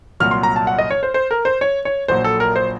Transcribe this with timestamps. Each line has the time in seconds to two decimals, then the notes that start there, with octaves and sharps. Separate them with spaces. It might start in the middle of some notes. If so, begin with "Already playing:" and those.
0.20 C2 A#2 F#3 F6
0.31 C6
0.43 A#5
0.56 A5
0.67 F#5
0.78 D#5
0.90 C#5
1.03 C5
1.14 C5
1.31 A#4
1.45 C5
1.61 C#5
1.85 C#5
2.08 A#1 A#2 F#3 C5
2.24 A4
2.40 A#4
2.56 C5